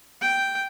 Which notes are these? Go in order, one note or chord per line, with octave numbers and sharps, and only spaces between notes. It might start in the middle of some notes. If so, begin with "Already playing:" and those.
G5